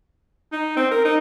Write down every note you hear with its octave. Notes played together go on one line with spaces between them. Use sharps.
D#4
C4
A#4
D#4